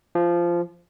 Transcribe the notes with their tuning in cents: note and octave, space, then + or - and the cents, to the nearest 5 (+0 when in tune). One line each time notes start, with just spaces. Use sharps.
F3 -15